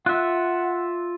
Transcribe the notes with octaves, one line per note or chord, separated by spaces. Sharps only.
F4 E5 F#5 F#6